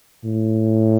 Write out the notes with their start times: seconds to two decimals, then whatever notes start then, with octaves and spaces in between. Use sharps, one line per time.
0.25 A2